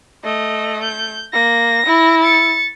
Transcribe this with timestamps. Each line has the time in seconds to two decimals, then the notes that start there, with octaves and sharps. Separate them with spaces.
0.24 A3 D#5
0.83 G6
1.34 A#3 A#6
1.86 E4
2.23 A6 C#7